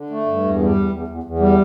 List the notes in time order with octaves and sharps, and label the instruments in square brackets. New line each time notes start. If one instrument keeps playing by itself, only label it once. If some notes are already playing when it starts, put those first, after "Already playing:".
Already playing: [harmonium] D3
A3
G2
E2
G3
E2
E2
E2
E2
G3